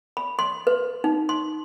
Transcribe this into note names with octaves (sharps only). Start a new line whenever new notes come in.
B5
C6
B4
D#4
C6